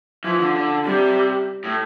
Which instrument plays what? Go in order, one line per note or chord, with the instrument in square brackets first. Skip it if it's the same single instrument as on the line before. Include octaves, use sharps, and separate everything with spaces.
[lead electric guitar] E3 [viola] F3
[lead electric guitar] D3
D3
[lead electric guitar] C3 [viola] G3
[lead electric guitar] A2